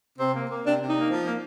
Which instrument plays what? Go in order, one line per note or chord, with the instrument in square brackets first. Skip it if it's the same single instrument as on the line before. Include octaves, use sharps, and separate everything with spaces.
[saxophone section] C3 C4
A#3
A#3
C3 D4
C3
D#4
A#3
F3
A#3